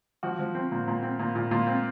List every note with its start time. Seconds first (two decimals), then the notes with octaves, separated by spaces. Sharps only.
0.23 F3 F#4
0.39 F3
0.55 C4
0.72 A#2
0.88 A#2
1.03 C4
1.19 A#2
1.35 A#2
1.51 A#2 F4
1.67 C4